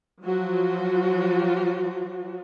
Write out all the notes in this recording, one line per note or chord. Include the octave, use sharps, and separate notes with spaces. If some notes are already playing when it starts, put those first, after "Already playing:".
F3 F#3 F#4